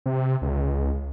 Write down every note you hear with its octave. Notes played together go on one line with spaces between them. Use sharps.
C3
C#2